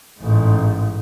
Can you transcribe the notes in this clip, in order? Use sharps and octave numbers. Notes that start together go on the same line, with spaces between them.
A1 G#2